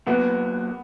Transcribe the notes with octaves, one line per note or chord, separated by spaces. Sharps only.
A#2 F#3 A#3 B3